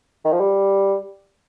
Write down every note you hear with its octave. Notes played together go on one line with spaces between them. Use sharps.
D#3
F3
G3